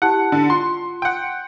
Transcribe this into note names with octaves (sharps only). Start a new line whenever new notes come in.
E4 G4 F#5 A5
D3
F4 C6
F#5 G5